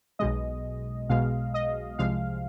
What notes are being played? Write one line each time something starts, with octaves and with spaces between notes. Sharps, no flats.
B1 B2 G#3 D#5
B1 B2 G#3 F5
D#5
C2 C3 F3 G#3 F5